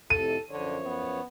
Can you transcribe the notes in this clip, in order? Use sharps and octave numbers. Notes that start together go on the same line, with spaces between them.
F2 A2 C3 A4 D#7
F#2 D3 F3 C#5
B3